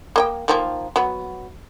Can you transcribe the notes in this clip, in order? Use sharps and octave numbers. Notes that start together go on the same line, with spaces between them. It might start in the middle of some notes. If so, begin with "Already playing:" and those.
A#3 D#5 G5
D#3 F3 A#3
F#3 B3